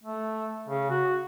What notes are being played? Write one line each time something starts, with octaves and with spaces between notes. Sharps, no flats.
A3
C#3
F#4